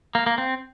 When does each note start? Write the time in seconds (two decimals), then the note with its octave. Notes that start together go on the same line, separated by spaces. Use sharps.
0.15 A#3
0.26 A#3
0.38 C4